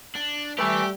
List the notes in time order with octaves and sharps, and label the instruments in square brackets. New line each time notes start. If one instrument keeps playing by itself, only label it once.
[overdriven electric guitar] D4
[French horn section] G3 [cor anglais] A3 [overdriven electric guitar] G4 [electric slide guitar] B4 G#5